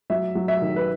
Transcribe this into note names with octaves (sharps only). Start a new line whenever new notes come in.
F#3 E5
F#3
E5
D#3
B4